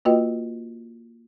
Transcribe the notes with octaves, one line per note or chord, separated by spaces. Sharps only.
A#3 F4 F#4 B4 D#5 G5